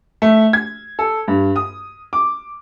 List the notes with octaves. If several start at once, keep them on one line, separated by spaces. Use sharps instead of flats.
A3
G#6
A4
G2
D#6
D6